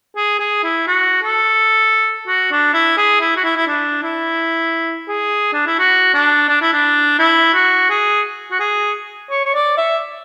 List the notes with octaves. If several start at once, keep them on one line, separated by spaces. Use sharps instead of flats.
G#4
G#4
E4
F#4
A4
F#4
D4
E4
G#4
E4
F#4
E4
E4
D4
E4
G#4
D4
E4
F#4
D4
D4
E4
D4
E4
F#4
G#4
F#4
G#4
C#5
C#5
D5
E5